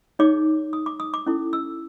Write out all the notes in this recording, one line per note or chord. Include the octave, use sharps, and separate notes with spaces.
D#4 G#4 C#5 D6
D#6
D6
D#6
D6
C#4 E4 A4
E6